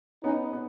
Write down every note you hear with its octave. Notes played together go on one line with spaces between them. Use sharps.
B3 C#4 D#4
B3